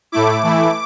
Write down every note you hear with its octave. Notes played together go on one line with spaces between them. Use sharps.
A2 A3 E4 D6
E3 A3 E4